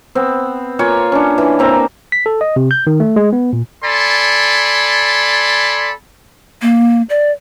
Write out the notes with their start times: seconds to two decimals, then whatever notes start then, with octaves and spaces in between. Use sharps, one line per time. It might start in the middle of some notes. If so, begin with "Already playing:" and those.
0.15 B3 C4
0.79 A#3 F4 C#5 G#5
1.12 C#4 D4
1.38 E3
1.59 A#3 C4 A#5
2.12 B6
2.26 A4
2.41 D#5
2.56 C3
2.71 G6
2.87 D#3
3.00 A3
3.16 G#3
3.33 B3
3.53 A#2
3.83 A4 D5 G#5 B5 C6
6.62 A#3
7.10 D5